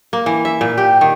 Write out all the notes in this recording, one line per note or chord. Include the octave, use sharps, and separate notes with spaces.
A#3
E3
E5
A#2
G4
D#3